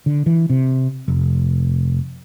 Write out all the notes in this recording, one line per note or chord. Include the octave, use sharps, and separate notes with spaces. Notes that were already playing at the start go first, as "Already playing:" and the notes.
D3
E3
C3
F1